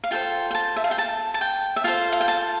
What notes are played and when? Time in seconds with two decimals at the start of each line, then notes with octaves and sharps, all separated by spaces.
0.04 F5
0.11 F4 A4 C5 G5
0.51 G5
0.55 A5
0.76 E5
0.84 F5
0.91 G5
0.98 A5
1.34 A5
1.41 G5
1.76 E5
1.84 F4 A4 C5 F5
2.12 F5
2.21 G5
2.28 A5